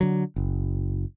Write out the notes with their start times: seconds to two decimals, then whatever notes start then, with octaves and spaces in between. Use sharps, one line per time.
0.01 D3 F#3
0.36 F#1